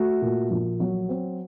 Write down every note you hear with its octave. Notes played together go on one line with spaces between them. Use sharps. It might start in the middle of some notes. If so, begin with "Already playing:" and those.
Already playing: A3 F#4
A#2
A#1
F#3
C4